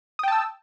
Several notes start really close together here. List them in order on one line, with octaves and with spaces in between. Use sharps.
D#6 G5 A5 E6